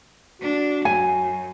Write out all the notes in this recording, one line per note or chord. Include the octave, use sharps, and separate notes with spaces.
D4 F#4
F#2 G#5